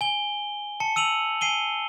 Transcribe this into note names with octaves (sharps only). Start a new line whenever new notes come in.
G#5 G7
A5 C#7
E6 D#7 F7 F#7
G#5 C7 D#7 G7